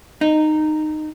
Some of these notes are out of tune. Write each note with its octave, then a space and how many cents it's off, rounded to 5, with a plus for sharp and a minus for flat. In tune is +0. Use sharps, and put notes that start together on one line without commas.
D#4 -15